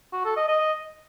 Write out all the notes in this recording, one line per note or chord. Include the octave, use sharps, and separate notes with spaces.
F#4
A4
D#5
D#5